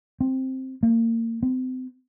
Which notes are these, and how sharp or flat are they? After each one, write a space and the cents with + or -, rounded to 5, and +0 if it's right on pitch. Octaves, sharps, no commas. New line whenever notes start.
C4 +5
A#3 -30
C4 -35